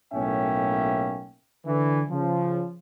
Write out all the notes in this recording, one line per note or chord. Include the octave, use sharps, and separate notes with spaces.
B1 A2 A#3 C#4 E5 G5
D3 E3
C#3 F3